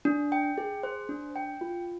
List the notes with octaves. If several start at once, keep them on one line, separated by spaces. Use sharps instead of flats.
D4
G5
G#4
C5
D4
G5
F4